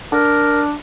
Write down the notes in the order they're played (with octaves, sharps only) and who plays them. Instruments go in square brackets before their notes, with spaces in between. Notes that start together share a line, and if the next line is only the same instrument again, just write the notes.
[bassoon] D4 [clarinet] A#4